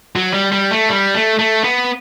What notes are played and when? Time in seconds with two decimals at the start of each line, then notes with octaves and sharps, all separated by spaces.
0.16 F#3
0.34 G3
0.52 G3
0.71 A3
0.89 G3
1.14 A3
1.39 A3
1.64 B3